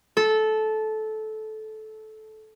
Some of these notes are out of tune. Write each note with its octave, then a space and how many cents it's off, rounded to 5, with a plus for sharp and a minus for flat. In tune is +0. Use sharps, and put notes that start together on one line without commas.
A4 -15